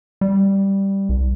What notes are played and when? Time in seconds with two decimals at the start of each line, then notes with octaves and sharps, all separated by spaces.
0.21 G3
1.09 C2